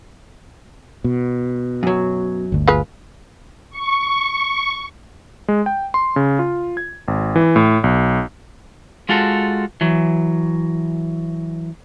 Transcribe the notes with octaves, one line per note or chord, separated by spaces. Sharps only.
B2
F#2 F#3
G1 D2
G#3 F4 B4
C#6
G#3
G5
C6
C#3
F4
G#6
G#1
E3
A2
B1
G#3 F4 F#4 A4
E3 F#3